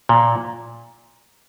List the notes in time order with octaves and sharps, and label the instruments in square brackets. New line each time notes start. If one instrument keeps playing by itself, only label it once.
[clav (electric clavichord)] A#2